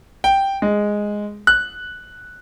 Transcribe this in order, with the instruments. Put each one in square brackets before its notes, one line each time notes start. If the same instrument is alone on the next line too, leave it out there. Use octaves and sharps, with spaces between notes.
[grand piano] G5
G#3
F#6